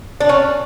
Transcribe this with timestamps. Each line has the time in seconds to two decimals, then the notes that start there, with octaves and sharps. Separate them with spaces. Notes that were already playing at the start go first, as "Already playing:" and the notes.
0.20 D4
0.29 C#4